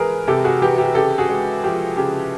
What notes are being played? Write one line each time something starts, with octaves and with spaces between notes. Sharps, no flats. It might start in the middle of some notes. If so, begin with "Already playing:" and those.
Already playing: E3 G#3 G#4 A#4 B4
C3 G4 A4
F#4 G#4
E3 G4
G4
C#3 G4 A4
F#4 G#4
G#3
F3 G4
C#3 G4